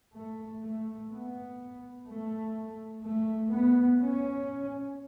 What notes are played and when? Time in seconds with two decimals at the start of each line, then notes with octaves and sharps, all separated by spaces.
0.15 A3
0.63 A3
1.11 B3
2.08 A3
3.04 A3
3.51 B3
4.00 C#4